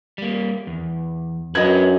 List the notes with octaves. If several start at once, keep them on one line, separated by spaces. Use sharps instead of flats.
G3 A#3
E2
F#2 D4 B4 D#5 G#6